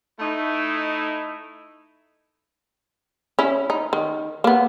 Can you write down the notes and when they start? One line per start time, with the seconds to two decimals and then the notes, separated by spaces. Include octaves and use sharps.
0.19 A3 D#4 E4
3.39 C#4 E4
3.70 D#4
3.93 D#3
4.44 A#3 B3